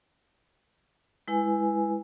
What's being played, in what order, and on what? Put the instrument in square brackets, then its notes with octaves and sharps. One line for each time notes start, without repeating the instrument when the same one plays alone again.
[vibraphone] G#3 E4 B4 G#5